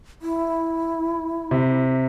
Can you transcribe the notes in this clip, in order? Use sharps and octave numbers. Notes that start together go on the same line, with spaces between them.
E4
C3